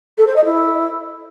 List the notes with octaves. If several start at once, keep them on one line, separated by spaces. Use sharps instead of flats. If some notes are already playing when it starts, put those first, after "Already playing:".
A4
C5
D#5
E4